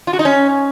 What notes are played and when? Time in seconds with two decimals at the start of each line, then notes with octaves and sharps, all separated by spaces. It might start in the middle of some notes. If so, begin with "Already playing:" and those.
0.07 F4
0.13 F#4
0.19 D#4
0.25 C#4